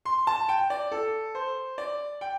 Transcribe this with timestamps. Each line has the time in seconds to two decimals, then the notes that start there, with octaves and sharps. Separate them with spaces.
0.05 C6
0.27 A5
0.49 G5
0.70 D5
0.92 A4
1.35 C5
1.78 D5
2.21 G5